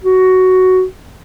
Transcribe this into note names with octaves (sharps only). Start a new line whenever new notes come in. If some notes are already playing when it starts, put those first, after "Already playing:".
F#4